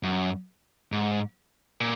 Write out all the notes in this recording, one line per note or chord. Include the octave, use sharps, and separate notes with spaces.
F#2
G#2
A#2